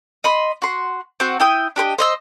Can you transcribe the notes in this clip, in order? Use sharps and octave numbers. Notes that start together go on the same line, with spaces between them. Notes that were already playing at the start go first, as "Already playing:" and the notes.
D#5 B5 C6
F#4 C6
C4 F#4
E4 G5 D#6
D4 G4 C5 D#5
C5 D#5 E6